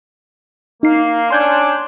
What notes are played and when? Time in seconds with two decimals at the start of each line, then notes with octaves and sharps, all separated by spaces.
0.83 A#3 D#4 C7
1.30 C#4 D4 C6 G6 G#6